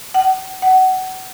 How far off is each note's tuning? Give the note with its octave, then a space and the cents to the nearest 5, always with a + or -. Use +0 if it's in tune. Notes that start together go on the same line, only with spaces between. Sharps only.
F#5 +40
F#5 +25